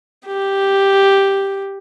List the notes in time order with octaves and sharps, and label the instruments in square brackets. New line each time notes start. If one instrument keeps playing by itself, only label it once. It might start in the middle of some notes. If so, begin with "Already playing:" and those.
[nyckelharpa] G4